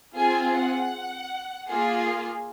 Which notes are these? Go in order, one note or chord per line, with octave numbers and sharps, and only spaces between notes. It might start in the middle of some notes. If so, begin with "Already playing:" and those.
C4 F4 G#4 G#5
F#5
A#3 F4 G#4